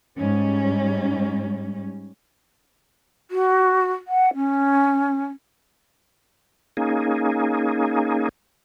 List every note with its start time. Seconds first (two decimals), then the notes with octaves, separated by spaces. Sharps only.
0.17 G#2 G3 C#4
3.31 F#4
4.08 F#5
4.34 C#4
6.77 A#3 C#4 D#4 G#4